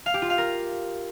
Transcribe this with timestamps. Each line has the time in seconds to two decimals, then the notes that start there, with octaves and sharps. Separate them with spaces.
0.06 F5
0.14 G4
0.22 F4
0.30 F5
0.38 A#4